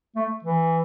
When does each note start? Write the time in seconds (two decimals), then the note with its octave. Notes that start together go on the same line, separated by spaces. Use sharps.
0.16 A3
0.44 E3